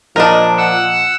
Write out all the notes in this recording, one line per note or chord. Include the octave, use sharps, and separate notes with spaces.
A#2 F3 D4 A#4 D#5 A5
F#5 E6